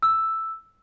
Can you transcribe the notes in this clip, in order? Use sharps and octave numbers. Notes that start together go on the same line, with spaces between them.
E6